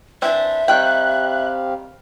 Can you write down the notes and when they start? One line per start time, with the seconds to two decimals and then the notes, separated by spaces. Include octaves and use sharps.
0.22 E3 C4 D4 E5
0.68 D#3 G3 C4 G4 F5 G5 F#6